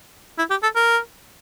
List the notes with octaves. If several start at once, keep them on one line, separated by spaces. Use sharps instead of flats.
E4
G4
A4
A#4